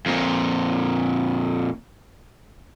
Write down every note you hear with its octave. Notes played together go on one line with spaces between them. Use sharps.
F2 A#2